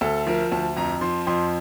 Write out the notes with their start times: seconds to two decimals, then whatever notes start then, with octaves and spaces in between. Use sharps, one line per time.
0.01 D2 A4
0.27 F3 A#4
0.52 D2 A5
0.77 F2 A#5
1.01 F3 C6
1.27 F2 C6